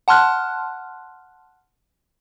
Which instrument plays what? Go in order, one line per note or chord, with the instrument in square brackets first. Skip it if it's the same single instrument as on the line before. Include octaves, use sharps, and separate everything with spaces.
[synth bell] F#5 A5 C6 F6 F#6